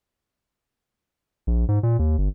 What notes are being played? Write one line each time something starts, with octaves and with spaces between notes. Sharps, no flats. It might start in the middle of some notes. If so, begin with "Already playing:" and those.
A#1
G#2
A#2
D#2
G1